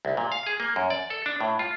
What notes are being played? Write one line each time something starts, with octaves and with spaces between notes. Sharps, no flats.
C2
A#2
F5
G#4
A#3
F#2
D5
A4
D4
A2
F4